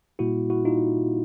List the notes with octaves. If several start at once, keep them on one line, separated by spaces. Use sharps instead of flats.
A#2 G3 A#3 E4 F#4
E4 F#4
D#4 F4